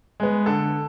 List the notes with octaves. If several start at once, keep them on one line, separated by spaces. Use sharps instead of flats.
G#3 B3
D3 A4